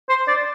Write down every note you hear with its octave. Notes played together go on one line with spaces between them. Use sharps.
C5
D5